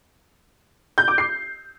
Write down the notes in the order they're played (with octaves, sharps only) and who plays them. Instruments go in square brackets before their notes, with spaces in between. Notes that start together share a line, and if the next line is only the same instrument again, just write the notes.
[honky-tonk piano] G6
D6
C7